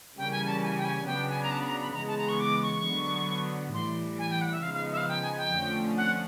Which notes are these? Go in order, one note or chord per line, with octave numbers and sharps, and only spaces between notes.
C#3 E3 G3 A#3 C#4 G5
G#5
A5
G#5
G5
G#5
C#3 F#3 B3 D4 F#4 G5
G#5
A#5
A5
B5
A#5
B5
B5
C#3 E3 G#3 B3 A#5
A5
A#5
C#6
D6
C#6
D3 F#3 B3
A2 E3 G3 C6
G#5
G5
F#5
E5
C#3 F3 G#3 B3 D#4 F5
F5
E5
F5
G5
G#5
G5
F2 D3 F3 A3 C#4
F#5